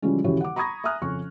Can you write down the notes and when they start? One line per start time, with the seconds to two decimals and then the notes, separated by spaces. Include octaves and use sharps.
0.02 C#3 E3 F3 G3 G#3 C#4
0.24 D#1 C#3 E3 F#4 G4 C#5
0.41 F#5 D6
0.56 A#5 B5 C#6 D#6 G#6 A#6
0.84 E5 G#5 A#5 D#6 F6 F#6
1.02 F2 C#3 C#4 C#6